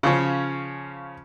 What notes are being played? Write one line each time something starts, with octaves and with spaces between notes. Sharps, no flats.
C#3 F3 C#4